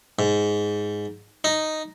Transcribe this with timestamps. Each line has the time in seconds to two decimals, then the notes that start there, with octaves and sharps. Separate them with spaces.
0.19 G#2
1.44 D#4